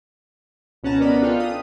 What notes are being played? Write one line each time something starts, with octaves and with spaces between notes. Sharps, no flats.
C#2 B2 C#4 F#5 A5 A#5
B3 A#4 D5 D#5 B5
D4 F4 A4 B4 F5 G5
D#6